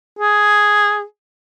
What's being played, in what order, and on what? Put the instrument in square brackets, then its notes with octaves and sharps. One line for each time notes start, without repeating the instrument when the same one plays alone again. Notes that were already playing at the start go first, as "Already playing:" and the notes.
[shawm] G#4